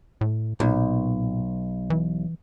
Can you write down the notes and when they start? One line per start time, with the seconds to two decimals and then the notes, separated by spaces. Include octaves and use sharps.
0.21 A2
0.60 B1 A#2
1.90 E3